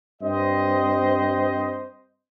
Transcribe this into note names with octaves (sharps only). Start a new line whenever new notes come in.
G2 C4 C5 D#5